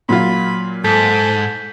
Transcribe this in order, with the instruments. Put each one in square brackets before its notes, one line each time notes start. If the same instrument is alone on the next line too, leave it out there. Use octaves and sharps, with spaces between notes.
[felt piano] A#2 F#3 F4 [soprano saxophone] B5
[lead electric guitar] G#2 [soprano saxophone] A4 [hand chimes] G6 B6